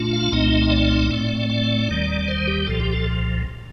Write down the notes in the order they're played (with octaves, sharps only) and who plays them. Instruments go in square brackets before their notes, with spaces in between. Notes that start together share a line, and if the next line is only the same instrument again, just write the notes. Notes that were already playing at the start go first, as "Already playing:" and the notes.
Already playing: [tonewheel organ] A#2 A3 D4 F4
F5
C2 A#2 A3 C4 D#4 D#5
D5
A2 A3 C4
D5
D#2 D#3 G3
C5
G4
C2 A#2 F3 A4
G4
A4